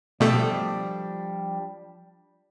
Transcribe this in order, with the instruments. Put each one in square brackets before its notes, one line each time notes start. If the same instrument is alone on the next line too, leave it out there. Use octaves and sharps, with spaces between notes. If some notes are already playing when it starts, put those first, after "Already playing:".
[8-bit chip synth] B2 A3 [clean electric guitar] F3 G3 D4